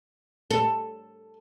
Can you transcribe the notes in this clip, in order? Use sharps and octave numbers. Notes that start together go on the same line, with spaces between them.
A4